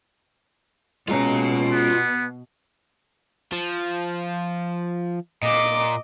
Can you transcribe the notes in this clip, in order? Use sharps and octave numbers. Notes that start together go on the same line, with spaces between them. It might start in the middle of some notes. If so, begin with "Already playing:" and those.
B2 G#3 C#4 F4 A#5
B3
F3
A#2 D#5 D6